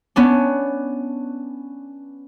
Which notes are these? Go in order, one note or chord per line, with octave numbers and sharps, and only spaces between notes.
B3 C#4 D4